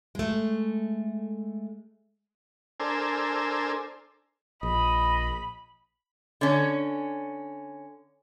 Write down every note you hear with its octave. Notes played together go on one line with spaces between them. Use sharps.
G#3 A3
D4 A4 A#4 C5 G#5 E6
A#1 D#5 B5
D3 C#4